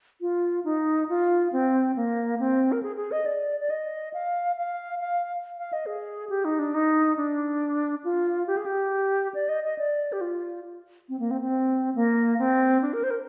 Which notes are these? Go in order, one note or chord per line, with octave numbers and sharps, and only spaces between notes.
F4
D#4
F4
C4
A#3
C4
A#4
G#4
G#4
D#5
D5
D5
D#5
F5
F5
F5
F5
D#5
G#4
G4
D#4
D4
D#4
D4
F4
G4
G#4
G4
D5
D#5
D#5
D5
G4
F4
C4
A#3
C4
C4
A#3
C4
D4
A#4
C5
A#4